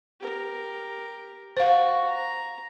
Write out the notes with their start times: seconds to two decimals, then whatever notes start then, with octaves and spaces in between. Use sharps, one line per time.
0.20 G4 A#4
1.57 F#4 C5 F5 C#6
2.07 A#5